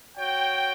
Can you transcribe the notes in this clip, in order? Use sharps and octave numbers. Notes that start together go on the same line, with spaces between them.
F#4 C#5 G5